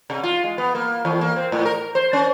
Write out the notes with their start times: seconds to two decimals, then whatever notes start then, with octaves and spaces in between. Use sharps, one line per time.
0.10 C3
0.23 F4
0.44 G#3
0.58 B3
0.75 A#3
1.05 E2
1.21 A#3
1.36 C4
1.52 A2
1.65 A#4
1.95 C5
2.13 C#4